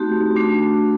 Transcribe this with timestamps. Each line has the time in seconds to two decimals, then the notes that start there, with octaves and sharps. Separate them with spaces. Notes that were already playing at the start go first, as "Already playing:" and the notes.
Already playing: A3 C4 D#4 F#4 G4
0.36 A3 D4 F#4